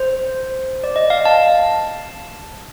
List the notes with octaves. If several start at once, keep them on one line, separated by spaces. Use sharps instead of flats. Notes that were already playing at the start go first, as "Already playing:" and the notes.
Already playing: C5
D5
D#5
F5
A5